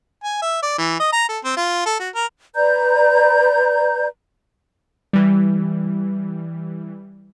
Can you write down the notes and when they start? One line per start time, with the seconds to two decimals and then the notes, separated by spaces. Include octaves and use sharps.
0.24 G#5
0.42 E5
0.63 D5
0.79 E3
1.00 D#5
1.13 A#5
1.29 A4
1.44 C4
1.57 F4
1.86 A4
2.00 F#4
2.15 A#4
2.55 B4 D5 A#5 G6
5.13 E3 G3